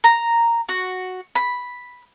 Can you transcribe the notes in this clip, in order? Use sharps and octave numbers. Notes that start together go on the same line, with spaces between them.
A#5
F#4
B5